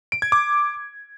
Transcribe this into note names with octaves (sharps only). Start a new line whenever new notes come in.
D7
G#6
D6